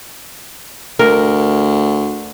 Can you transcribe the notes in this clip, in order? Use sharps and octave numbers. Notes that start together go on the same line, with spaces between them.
D2 A#4